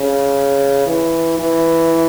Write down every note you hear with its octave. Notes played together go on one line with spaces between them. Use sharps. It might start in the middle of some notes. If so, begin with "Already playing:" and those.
Already playing: C#3
E3
E3